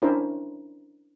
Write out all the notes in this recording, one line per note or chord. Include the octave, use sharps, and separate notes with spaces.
C#4 D4 E4 A#4 C5